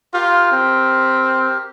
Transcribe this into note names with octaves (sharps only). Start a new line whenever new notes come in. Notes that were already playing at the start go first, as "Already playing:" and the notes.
F4 G4 A#4
C4